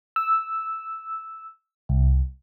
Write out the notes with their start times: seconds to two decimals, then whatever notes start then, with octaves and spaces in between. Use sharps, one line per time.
0.16 E6
1.89 C2